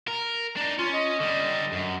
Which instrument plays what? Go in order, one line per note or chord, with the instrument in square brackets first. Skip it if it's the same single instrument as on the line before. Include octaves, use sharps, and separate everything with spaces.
[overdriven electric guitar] A#4
D4 D#4
[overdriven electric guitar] C#4 [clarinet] F4
[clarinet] D#5
[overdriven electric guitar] D3 G3
F#2